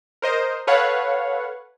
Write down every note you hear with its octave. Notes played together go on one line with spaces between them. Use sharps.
A#4 C5 D#5
A4 B4 C#5 F5 F#5